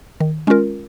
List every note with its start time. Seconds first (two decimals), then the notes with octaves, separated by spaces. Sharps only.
0.20 D#3
0.47 G#3 C#4 F4 A#4